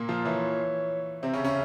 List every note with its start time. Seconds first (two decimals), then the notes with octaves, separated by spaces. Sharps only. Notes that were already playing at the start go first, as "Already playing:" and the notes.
Already playing: A#2 A#3
0.09 F3 F4
0.25 E3 E4 C#5
1.23 C3 C4 E5
1.33 C#3 C#4
1.44 C#3 C#4